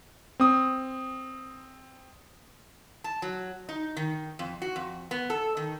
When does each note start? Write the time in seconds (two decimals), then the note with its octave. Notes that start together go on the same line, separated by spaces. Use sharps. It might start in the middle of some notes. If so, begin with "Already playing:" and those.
0.40 C4 D#6
3.04 A5
3.22 F#3
3.69 D#4
3.97 D#3
4.39 F2
4.62 F#4
4.76 F2
5.11 B3
5.30 A4
5.57 D#3